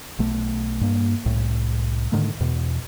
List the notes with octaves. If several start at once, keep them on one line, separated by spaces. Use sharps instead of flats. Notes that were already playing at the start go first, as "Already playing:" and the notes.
B1 A3
G2 A#3
C2 A2
G#2 D3 D#3 A3
E2 B2